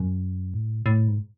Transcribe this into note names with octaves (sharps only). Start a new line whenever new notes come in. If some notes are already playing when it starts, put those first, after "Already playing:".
Already playing: F#2
A2
A2
G#2